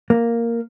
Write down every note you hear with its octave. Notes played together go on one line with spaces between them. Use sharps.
A#3